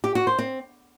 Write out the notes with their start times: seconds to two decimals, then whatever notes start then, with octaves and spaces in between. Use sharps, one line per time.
0.04 G4
0.15 F#4
0.27 C5
0.39 C4